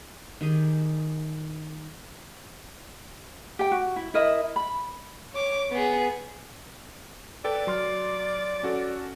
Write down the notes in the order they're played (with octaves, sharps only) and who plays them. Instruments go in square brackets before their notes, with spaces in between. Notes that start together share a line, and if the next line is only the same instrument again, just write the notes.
[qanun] D#3 G4 G#4
[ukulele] G4 G5
F#4
E4
E4 A#4 D#5 E5
B5
[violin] C#5 D6
B3 G#4
[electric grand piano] A4 B4 G5 [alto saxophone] D5
[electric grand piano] F#3 C6 F6
C#4 F#4 A4